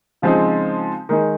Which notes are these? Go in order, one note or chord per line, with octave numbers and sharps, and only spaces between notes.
C#3 F3 G#3 C4 D#4
D#3 G#3 D#4